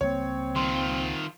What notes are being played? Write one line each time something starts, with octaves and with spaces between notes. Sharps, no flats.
C#2 G3 A#3 C4 C#5
D#3 F4 C6